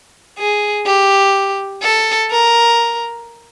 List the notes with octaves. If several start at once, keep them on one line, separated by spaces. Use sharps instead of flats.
G#4
G4
A4
A#4